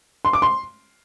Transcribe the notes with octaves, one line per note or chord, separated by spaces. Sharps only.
C6
D6
C6